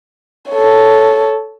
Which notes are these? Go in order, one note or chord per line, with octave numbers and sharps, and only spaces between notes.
A4 C#5